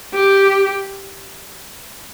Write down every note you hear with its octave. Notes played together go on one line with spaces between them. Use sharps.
G4